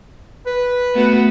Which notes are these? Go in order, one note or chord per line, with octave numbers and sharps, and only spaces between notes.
B4
A3 B3 F#4